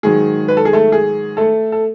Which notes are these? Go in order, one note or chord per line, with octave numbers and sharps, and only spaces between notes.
G#2 D#3 F#3 G#4
B4
A4
G#4
A3 A4
G#4
A3 A4
A4